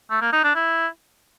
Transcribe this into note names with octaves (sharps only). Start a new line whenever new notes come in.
A3
A#3
D#4
D4
E4